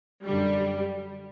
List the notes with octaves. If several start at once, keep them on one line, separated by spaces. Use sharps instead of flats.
F#2 D3 G3